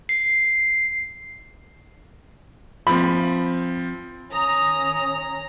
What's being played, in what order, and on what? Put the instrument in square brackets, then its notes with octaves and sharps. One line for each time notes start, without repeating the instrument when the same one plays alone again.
[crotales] C7
[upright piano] F3 C4 [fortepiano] B5
[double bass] D#3 C#4 [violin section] A#5 [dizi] D#6